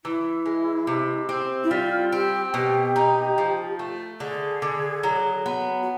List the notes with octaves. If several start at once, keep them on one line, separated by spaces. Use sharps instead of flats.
E3 E4
G#3
C3
C4
E4
G3 F4
C4 G4
B2 G4
D#4
F3
A3
D3 G#4
D3
F#3
B3
F#4